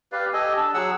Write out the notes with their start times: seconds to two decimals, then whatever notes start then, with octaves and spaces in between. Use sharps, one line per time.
0.12 G4 B4 D5 F5
0.33 G4 A4 D#5 G#5
0.57 D4 A5
0.74 F#3 G#4 F#5 E6